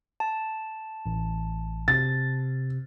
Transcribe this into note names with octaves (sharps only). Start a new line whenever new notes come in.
A5
A1
C3 A6